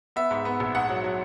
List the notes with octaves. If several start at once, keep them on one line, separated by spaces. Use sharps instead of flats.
B3 E5
G#2
B3
A#1
G#2 F#5
F#3
F#3